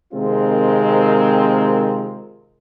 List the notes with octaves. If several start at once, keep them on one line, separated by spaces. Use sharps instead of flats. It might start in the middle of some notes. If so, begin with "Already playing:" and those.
C3 D#3 G#3 C4 F4 A#4